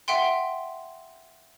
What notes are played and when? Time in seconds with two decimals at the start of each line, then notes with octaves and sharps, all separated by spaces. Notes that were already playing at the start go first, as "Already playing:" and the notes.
0.08 E5 F#5 G5 C6